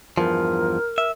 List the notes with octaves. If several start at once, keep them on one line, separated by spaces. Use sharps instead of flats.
E2 G2 F3 A#4
E5